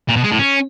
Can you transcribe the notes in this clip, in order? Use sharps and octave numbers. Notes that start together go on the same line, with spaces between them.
A#2
B2
G#3
A2
C#4